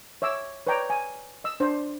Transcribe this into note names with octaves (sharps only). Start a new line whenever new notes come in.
C#5 E5 D6 E6
B4 C#5 D5 G5 A#5 D6
G#5
D#5 E6
D4 C5